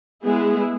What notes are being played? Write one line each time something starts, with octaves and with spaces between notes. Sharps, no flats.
G#3 B3 E4 G#4